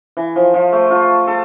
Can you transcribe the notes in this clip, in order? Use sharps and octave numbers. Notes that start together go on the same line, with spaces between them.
E3
F3
F3
A3
F4
A4